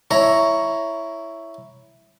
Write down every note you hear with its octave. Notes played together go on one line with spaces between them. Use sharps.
E4 C#5 A#5